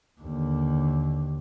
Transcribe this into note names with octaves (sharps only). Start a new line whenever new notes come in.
D#2 D3